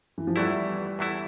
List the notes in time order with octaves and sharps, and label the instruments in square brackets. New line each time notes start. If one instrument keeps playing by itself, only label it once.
[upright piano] E3
F3
[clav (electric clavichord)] E2 E3 A3 E4 [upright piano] G3
[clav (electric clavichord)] E2 E3 A3 E4